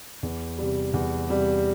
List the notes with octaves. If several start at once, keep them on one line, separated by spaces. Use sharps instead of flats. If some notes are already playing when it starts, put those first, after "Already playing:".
E2
C3 G3
E2
C3 G3